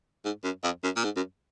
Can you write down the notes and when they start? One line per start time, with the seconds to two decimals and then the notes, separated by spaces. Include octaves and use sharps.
0.25 G#2
0.44 F#2
0.64 F2
0.83 F#2
0.96 A#2
1.04 G#2
1.16 F#2